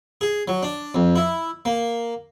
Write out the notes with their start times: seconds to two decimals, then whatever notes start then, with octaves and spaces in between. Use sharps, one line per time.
0.21 G#4
0.48 F#3
0.63 D4
0.95 F2
1.16 E4
1.65 A#3